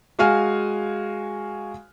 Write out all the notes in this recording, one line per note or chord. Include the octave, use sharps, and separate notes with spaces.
G#3 F#4 F5 G#5 F6